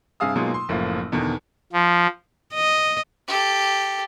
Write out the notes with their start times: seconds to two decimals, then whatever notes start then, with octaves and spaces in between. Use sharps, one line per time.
0.20 G2 C3 G#4 F5 D#6 E6
0.36 B2 F#3 G#3 A#3 D#4 F4
0.54 C6
0.69 F#1 A2 F3 A#3
1.12 E2 B2 D3 D#3
1.73 F3
2.54 D#5
3.28 G4 A4